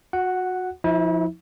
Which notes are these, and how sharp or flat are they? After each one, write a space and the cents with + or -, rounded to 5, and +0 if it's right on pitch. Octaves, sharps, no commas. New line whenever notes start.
F#4 -25 F#5 +0
F3 +0 E4 -40 E5 +0